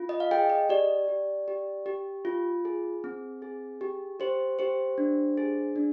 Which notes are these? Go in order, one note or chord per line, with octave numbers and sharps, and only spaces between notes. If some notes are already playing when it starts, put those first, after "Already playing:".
Already playing: F4
D#5
F5
G#4 G5
D#5
G4 D5
G4
G4
G4
F4
G#4
C4
G#4
G4
G4 C5
G4 C5
D4
G#4
D4